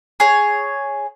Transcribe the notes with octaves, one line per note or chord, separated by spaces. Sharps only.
G#4 C#5